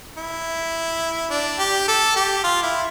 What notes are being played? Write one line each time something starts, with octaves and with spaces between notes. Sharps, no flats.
E4
D4
G4
A4
G4
F4
E4